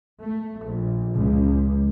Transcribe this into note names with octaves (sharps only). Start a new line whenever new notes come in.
A3
A#1
C#2